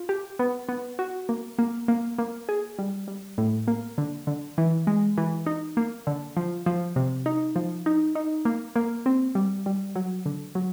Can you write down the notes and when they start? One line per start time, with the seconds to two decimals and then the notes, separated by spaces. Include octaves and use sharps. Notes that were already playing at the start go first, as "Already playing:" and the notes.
Already playing: F4
0.09 G4
0.39 B3
0.69 B3
0.99 F#4
1.29 A#3
1.58 A#3
1.88 A#3
2.18 A#3
2.49 G#4
2.79 G3
3.08 G3
3.38 A2
3.67 A#3
3.98 D3
4.27 D3
4.58 E3
4.87 G#3
5.18 E3
5.46 D#4
5.77 A#3
6.07 D3
6.37 F3
6.66 F3
6.96 C3
7.26 D#4
7.56 F3
7.86 D#4
8.15 D#4
8.45 A#3
8.76 A#3
9.06 C4
9.35 G3
9.66 G3
9.96 F#3
10.26 D3
10.55 F#3